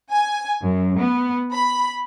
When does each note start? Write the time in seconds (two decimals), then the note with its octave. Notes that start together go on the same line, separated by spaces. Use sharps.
0.11 G#5
0.62 F#2
0.98 B3
1.51 B5